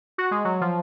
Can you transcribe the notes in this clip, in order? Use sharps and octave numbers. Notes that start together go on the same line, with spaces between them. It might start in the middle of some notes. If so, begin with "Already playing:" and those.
F#4
G#3
F#3
F3